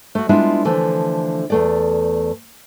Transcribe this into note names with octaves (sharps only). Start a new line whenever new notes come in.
A3 F#4
G3 G#3 B3 D4 E4 F4
D3 E3 F3 A3
E2 A3 D5